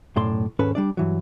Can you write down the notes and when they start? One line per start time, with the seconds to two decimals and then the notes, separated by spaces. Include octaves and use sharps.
0.16 B1 F#2 A2 A4 D5 C6
0.59 D#2 G#2 C#4 A4 B4
0.75 G3 D4 D5
0.97 G2 E3 F#3